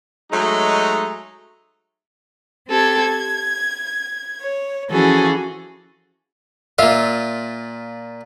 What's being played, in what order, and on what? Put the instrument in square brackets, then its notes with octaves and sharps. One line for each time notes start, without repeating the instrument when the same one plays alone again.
[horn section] F#3 G#3 A3 D#4
[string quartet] C4 G4 A4 G#6
G#6
C#5
E3 F3 C#4 F#4 G#4 A4
[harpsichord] A#2 F4 [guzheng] E5 F5